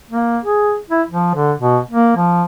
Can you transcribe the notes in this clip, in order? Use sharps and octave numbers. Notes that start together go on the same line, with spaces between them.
A#3
G#4
E4
F3
D3
B2
A#3
F3